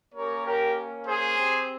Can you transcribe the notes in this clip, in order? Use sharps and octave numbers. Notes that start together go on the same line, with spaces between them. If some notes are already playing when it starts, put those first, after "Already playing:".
A#3 C#4 G4 A#4 C#5
G4 A#4
G#4 C5
C4 G4